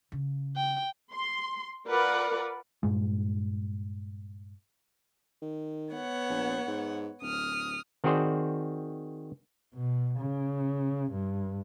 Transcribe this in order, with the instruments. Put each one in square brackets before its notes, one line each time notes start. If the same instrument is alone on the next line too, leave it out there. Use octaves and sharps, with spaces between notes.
[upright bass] C#3
[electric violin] G5
[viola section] C6
F4 A#4 B4 D5 F#5
[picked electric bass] G2 A#2 G#3
[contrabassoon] D#3
[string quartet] B3 C#5 F#5
[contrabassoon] A#1
G#2
[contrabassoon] D1 [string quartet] D#6 F6
[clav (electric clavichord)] D#3 C4 F#4 G#4 C5 D5
[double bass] B2
C#3
G2